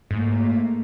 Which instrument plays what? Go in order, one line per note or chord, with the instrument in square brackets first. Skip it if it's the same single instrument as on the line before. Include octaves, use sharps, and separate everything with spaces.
[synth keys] G#2 [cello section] A3 A#3